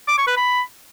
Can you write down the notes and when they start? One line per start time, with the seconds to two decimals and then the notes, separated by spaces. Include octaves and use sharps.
0.08 D6
0.18 C#6
0.27 B4
0.37 B5